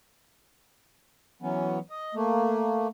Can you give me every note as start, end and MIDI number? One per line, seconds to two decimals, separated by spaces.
1.42 1.79 52
1.42 1.79 54
1.42 1.79 59
1.42 1.79 61
1.90 2.15 75
2.15 2.88 57
2.15 2.88 58